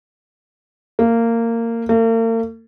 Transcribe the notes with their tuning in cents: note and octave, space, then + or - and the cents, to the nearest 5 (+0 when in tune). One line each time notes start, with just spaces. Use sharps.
A#3 -20
A#3 -45